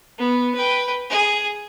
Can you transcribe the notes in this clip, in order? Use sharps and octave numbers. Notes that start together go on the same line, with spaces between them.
B3
B4 G5
G#4